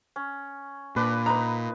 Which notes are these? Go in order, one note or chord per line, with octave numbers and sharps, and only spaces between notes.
C#4
A#2 D4 B4 D5
D#4 B4 A#5